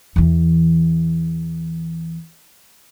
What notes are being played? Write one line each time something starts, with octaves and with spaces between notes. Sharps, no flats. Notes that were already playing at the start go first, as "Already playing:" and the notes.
E2 E3